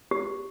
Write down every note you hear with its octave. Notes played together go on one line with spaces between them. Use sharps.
G4